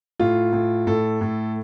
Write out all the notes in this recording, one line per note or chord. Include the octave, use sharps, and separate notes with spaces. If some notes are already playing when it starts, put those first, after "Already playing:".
A2 F4
A2
A2 A4
A2